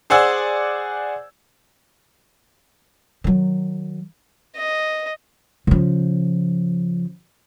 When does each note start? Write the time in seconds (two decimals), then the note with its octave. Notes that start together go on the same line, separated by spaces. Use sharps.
0.10 G#4 C5 D5 F#5 G#5 E6
3.24 D#3 F#3
4.56 D#5
5.67 C#3 F3